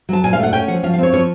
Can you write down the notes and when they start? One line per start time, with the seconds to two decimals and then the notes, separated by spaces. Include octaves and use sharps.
0.09 F#3 A5
0.24 A#2 G#5
0.33 F5
0.39 A3 F#5
0.53 C#4 G5
0.68 F3 F#5
0.83 F3 F5
0.94 F5
0.98 C4 C#5
1.13 F3 C#5